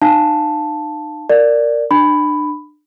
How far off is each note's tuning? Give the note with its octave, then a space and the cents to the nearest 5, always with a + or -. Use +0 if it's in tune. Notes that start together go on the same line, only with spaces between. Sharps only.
D#4 -35 F5 +0 A5 +0
A#4 -10 D5 +0
D4 +30 B5 +10